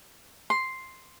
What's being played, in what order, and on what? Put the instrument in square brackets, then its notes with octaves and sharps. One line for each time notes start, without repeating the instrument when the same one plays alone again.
[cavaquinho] C6